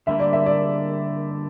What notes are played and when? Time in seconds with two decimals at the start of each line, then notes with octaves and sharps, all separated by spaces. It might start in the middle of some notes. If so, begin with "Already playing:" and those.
0.07 D3 G3 A#3 E5
0.20 D5
0.33 E5
0.46 D5